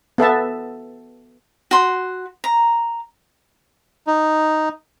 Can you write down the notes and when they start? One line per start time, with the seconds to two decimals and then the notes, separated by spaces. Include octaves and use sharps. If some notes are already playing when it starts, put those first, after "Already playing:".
0.18 B3 A4 E5 A5
1.71 F#4 C6
2.44 A#5
4.07 D#4